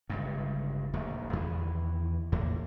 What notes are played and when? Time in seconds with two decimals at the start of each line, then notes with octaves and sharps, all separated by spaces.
0.10 G1 C#2 G2
0.93 D#1 A#1 D#2 A3
1.33 E2 D#3 E3
2.32 A#1 E2 A2 A#3